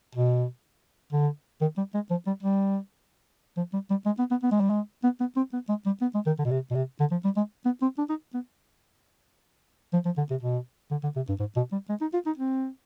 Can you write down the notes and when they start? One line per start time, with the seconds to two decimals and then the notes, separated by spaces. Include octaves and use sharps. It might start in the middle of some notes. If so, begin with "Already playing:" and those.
0.15 B2
1.12 D3
1.61 D#3
1.77 G3
1.94 G#3
2.10 F3
2.26 G3
2.43 G3
3.57 F3
3.73 G3
3.90 G3
4.06 G#3
4.19 B3
4.31 B3
4.43 B3
4.52 G#3
4.60 G3
4.70 G#3
5.04 B3
5.20 B3
5.36 C4
5.53 B3
5.69 G#3
5.86 G3
6.01 B3
6.14 G#3
6.26 D#3
6.39 D3
6.45 B2
6.51 C3
6.71 B2
6.75 C3
7.00 D3
7.11 F3
7.24 G3
7.37 G#3
7.65 B3
7.82 C4
7.98 D4
8.09 D#4
8.34 B3
9.93 F3
10.05 F3
10.17 D3
10.31 C3
10.43 B2
10.91 D3
11.03 D3
11.16 C3
11.28 G2
11.39 G#2
11.56 B2
11.72 G3
11.89 G#3
12.01 D#4
12.13 F4
12.26 D#4
12.38 C4